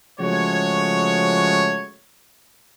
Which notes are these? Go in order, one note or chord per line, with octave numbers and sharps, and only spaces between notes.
C#3 F3 G#3 A3 F#4 C#5